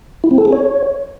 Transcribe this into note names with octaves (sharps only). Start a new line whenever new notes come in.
E4
C4
A4
G#4
C#5